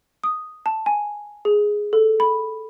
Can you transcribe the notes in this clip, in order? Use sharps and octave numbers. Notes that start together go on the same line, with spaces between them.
D#6
A5
G#5
G#4
A4
B5